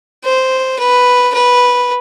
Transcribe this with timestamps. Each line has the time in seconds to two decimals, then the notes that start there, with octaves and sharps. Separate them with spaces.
0.24 C5
0.79 B4
1.34 B4